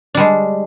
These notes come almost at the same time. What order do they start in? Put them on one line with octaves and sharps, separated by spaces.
D4 G3 G#3